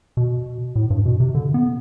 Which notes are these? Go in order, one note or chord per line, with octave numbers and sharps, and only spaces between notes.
B2
A2
G2
B2
C3
D3
B3